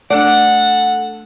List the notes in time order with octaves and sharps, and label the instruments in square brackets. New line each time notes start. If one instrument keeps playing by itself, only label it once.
[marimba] A3 D4 [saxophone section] A4 F#5 [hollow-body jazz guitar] D5